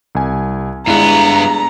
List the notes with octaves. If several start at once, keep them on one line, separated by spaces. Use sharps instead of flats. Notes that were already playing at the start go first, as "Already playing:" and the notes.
C2 G#5
G2 G#3 B3 D4 E4 A#5